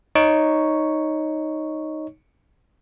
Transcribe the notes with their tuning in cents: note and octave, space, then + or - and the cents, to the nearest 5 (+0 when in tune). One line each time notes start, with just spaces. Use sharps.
D#4 +0 C#5 +0 C#6 +0